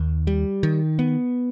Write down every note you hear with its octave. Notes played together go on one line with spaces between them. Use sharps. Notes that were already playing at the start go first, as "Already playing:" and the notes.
Already playing: D#2
G3
D#3
B3